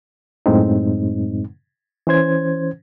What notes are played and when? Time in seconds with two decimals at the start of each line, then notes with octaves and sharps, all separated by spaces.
0.46 F#2 A2 G#3 C4 D#4
2.07 E3 C#4 C5 G#6